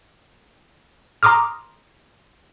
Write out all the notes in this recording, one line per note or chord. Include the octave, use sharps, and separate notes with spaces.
A#5 C6 D6 D#6 F6